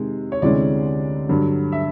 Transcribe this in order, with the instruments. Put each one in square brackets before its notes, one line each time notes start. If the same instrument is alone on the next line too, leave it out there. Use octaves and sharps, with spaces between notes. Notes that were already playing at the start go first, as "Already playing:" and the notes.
Already playing: [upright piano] C3 D#3 G#3
C#5
D2 C3 E3 G#3 C#4 D5
G2 D3 F#3
E5